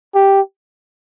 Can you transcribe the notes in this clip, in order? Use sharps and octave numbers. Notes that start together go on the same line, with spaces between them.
G4